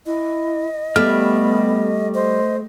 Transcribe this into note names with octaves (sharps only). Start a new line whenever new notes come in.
E4 D#5
G3 A3 B3 G4 F6
C5 D#5